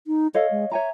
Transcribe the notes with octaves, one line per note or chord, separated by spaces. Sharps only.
D#4
A4 C#5 D#5 F5
G#3
C#5 E5 G#5 A#5